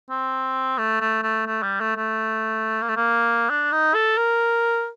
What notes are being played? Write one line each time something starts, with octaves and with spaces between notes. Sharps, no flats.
C4
A3
A3
A3
A3
G3
A3
A3
A#3
A3
A#3
D4
D#4
A4
A#4